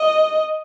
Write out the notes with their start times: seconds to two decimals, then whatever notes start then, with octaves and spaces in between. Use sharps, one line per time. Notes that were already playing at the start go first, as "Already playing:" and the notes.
Already playing: D#5